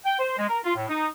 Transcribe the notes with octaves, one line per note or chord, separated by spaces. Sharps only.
G5
C5
G#3
A#4
F4
A2
D#4